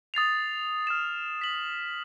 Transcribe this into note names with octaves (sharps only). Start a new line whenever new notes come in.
D#6 A6 C7 F7
F6 A6 E7
B6 F#7